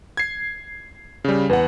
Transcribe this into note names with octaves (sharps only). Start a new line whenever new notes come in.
G#6 C7
C#3 G3
E2 B4 F#5